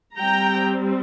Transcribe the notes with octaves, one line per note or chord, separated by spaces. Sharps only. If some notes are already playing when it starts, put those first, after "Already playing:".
G3 C4 G5 A#5